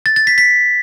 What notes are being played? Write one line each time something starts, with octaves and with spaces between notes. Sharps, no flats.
A6
A6
B6
B6